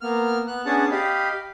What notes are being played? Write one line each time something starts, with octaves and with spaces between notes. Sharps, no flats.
A#3 B3 F6
B3 F#6
B3 C#4 D4 G#4 F#5 A5
G4 D#5 F5 B5